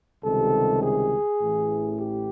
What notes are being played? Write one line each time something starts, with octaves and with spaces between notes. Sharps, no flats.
C#2 C3 D#3 G3 A4
G#4
A1 A2 E3
G4